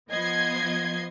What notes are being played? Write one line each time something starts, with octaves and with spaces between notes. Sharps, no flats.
F3 B3 D#5 G#6 C7